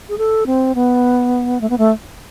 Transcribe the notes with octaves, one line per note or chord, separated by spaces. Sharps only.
G#4
A4
C4
B3
A3
B3
A3